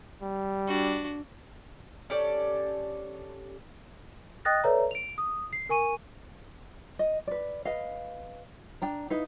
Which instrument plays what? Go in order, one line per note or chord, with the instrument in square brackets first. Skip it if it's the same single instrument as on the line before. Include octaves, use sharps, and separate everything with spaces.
[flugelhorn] G3
[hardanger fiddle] D4 F#4
[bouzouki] C#4 G4 A4 D5
[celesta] D#5 G5 D#6 F#6 A6 A#6
A4 B4 C#5 D5 E5 A#5
D7 F7
D#6
C7
A#4 G#5 C#6 D#7
[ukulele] D#5
B4 D5
B4 D#5 F5
D4 G5 A#5
D#4 E4 B4 F5